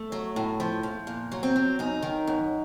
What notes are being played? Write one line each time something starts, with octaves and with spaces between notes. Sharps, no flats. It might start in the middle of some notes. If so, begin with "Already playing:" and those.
Already playing: A3
F#3
A2
F3
F3
A#2
F#3
C4
F#3
F#2 D#4
D#3
F#2